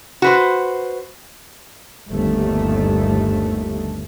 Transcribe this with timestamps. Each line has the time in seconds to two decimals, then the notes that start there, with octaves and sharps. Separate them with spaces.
0.22 F#4 B4 C5
2.10 G1 D#2 A3